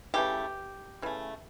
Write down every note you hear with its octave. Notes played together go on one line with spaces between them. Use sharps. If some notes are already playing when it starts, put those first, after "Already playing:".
C#3 E3 A3 G4
C#3 E3 A3